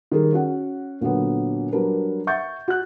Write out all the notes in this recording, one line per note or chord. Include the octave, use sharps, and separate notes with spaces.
D#3 G3 G#4 A#4
C#4 F#4 F#5
A#2 D3 F#3 B3
F#3 G3 D4 A#4 B4
E5 F#5 C#6 G6 A6
F#4 F#6